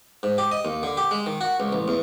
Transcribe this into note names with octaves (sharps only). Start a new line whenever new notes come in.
G#2
G4
D#5
D#2
D3
G4
G#3
D#3
F#4
C#2
A1
E2